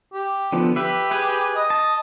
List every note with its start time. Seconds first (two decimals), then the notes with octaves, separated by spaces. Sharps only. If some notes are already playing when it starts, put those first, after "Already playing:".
0.14 G4
0.52 D3 F3 B3
0.76 G4 B4 E5
1.11 G#4 B4
1.55 D#5
1.70 A5